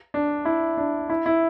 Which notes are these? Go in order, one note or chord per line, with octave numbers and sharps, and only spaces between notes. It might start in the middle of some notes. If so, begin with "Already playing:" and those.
D4
E4
D4
E4
E4